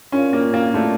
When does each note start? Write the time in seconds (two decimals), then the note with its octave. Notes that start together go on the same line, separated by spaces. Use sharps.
0.12 C#4 F4 A#4 D5 F5
0.33 A#3
0.54 A#3
0.74 A3 F4 A#4 D5 F5